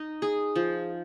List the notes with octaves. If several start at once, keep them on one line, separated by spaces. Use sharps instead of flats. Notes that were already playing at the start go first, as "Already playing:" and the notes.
Already playing: D#4
G#4
F3